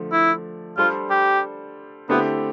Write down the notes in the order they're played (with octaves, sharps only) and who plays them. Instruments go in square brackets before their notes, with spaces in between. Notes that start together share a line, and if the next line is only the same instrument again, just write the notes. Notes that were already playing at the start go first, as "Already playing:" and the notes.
Already playing: [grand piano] D3 F3 A3
[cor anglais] E4
[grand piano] G3 D4 A4 C5 [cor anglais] F4
[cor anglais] G4
[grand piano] D3 A3 C4 E4 G4 [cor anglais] B3